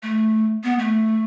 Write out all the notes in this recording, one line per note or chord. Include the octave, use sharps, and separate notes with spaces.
A3
B3
A3